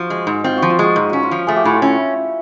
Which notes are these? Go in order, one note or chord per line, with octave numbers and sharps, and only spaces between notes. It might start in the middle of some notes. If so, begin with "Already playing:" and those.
Already playing: F3 F#4
G#3
G#2
C4 F4
F3 F#4
F4
G#3 F#4
G#2 F4
C#4 F#4
F4
F3
A3 G#4
G4
A2 F#4
F4
C#4 E4